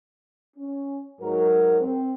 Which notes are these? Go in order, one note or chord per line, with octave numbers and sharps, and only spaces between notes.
C#4
G#2 F#3 A#4
C4